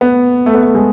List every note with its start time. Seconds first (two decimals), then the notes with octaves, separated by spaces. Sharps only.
0.01 B3
0.46 A3
0.54 B3
0.63 A3
0.75 G#3